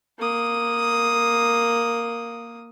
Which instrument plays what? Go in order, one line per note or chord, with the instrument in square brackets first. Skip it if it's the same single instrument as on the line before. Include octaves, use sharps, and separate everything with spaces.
[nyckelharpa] A#3 D#6